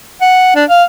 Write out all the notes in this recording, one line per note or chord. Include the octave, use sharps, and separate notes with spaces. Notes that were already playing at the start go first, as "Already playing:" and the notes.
F#5
D4
F5